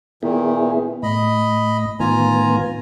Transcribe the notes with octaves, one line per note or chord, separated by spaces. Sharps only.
A#2 D#3 B3 E4 G#4
A2 D#5 B5
A2 D#3 B3 F4 G#5 A#5